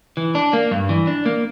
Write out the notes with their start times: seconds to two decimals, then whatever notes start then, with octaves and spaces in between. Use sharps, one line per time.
0.17 E3
0.35 D4
0.53 A#3
0.71 G2
0.89 E3
1.07 D4
1.26 A#3